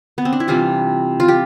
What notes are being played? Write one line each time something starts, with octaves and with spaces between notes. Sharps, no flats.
B3
C4
D4
E4
C3 E3 G3 F4
F4
G4